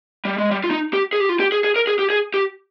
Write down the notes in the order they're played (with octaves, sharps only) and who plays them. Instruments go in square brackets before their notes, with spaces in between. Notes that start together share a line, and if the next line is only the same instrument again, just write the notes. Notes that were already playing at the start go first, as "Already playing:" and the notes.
[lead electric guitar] G3
G#3
G3
F4
D#4
G4
G#4
G4
F4
G4
G#4
G#4
A#4
G#4
G4
G#4
G4